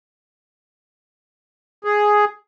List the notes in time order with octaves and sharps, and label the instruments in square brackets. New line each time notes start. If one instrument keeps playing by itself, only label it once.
[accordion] G#4